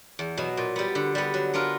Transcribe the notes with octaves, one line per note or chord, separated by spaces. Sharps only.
E2
B2 F#3
A#2
G3 B3
D3
G3 B3
F#3
B3 D4 F4 A#4